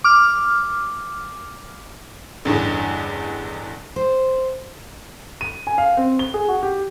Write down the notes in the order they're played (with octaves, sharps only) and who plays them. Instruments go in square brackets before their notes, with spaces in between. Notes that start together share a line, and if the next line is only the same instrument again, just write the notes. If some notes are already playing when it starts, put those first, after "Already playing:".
[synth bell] D6 F6
[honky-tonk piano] A1 E2 G2 D3
[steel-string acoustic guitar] C5
[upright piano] D#7
G#5
F5
C4
G7
G#4
F#4
G4